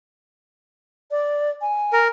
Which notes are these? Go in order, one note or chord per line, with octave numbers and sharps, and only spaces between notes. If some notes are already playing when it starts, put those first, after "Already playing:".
D5
G#5
A#4